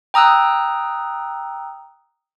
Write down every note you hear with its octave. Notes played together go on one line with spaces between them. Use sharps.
G5 A#5 D#6 E6 F#6